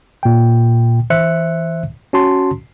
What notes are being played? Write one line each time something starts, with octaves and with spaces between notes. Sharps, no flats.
A#2 G5
E3 C5 E5 F#6 C#7
C#4 F#4 A5 C6